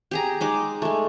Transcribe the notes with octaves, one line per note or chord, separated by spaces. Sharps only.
G4 G#4 A#5
G#3 D#4 D6
G#3 A3